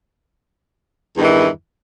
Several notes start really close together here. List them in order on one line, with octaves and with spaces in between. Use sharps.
E2 G2 D#3 E3